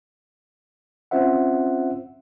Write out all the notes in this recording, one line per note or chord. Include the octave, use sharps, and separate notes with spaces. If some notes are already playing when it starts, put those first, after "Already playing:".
C4 C#4 F4 C5 E5 F#5